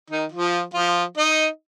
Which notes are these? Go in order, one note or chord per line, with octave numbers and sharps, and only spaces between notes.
D#3 D#4
F3 F4
F3 F4
D#4 D#5